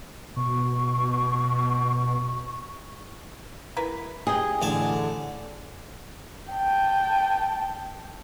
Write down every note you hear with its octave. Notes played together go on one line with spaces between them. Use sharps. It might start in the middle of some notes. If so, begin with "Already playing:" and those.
B2 C#6
E4 A#4 B4
G4 G#4 D#5
A1 D3 G#5 A5
G5 A5